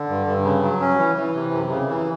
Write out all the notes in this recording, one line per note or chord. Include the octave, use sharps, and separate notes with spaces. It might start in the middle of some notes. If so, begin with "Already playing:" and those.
Already playing: D3
G2
G2
C#3
F#3
C#4
E3
E3
C3
F#2
C#3
E3